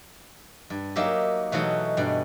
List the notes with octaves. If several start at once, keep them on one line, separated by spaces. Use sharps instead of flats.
G2
F#3 A#3 D#4 G4 E5
B2 E3 F#3 A3 D#4 F#4
G2 B2